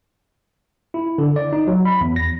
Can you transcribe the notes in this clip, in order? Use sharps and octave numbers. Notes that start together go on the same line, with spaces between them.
E4
D3
D5
D#4
F#3
B5
E2
A#6